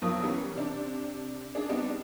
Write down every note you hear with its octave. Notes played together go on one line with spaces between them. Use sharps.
B1 F2 A#4 D#6
E3 G3 B3 C#4 A#4
C3 D4
D4 G#4
G3 B3 C4 D4 D#4